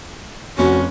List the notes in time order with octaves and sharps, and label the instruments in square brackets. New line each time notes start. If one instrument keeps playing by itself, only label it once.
[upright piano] F1 [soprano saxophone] C#4 [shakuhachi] F#4